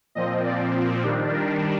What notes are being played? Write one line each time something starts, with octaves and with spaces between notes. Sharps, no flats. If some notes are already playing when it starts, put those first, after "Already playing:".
A#2 F3 C4 D#5
D5
D#3 G3 D4
A#4